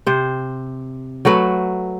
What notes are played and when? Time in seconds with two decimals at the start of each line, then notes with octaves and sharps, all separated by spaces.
0.07 C3 C5
1.25 F#3 A3 F#4 B4